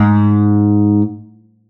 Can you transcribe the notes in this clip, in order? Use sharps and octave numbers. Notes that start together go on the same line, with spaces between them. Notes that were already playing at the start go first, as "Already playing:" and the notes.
Already playing: G#2